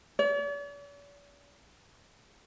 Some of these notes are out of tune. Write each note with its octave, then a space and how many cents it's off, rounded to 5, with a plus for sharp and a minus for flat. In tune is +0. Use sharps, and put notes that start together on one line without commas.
D5 -45